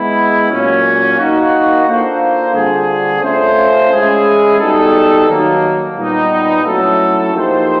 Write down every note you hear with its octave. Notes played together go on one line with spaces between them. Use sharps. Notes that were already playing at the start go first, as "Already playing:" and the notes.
Already playing: G#3 B3 E4
A#2 F#3 A#3 C#4
A#3 D#4 F#4
A#3 D4 F4 A4 C5
D3 G3 C4 F4 G#4
A3 C#4 F4 A4 C5
G#3 C#4 E4 G#4
G3 B3 D#4 F#4 A4
D#3 F#3 A#3
A#2 G3 B3 D#4
F#3 A3 C#4 E4 A4
F3 A#3 D#4 G4 C5